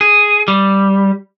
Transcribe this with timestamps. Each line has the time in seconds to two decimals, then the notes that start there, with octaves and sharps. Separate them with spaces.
0.01 G#4
0.48 G3